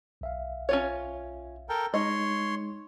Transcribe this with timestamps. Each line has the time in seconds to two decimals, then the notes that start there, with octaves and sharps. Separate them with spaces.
0.21 B1 E5 F5
0.69 C#4 F4 C#5
1.69 A4 A#4 G5
1.94 G#3 D#4 C#5 D#5 C6